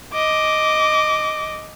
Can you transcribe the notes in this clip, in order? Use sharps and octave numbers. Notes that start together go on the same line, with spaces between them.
D#5 D6